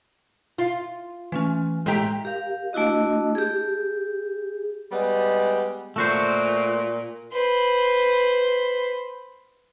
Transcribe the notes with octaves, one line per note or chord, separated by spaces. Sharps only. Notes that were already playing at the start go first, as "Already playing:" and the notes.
F4
E3 A3 C#4
A2 G#3 G4 A#5
G4 A#4 F5
A3 D4 E4 F#4 D#5
G4 G#4
G3 G#3 B3
A#2 A3 F#4 C5
B4 C5